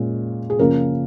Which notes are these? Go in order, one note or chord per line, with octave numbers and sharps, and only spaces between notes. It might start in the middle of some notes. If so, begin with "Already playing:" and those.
Already playing: A#2 G#3 C#4
G#4
C#3 F3 A#3 C#4 A#4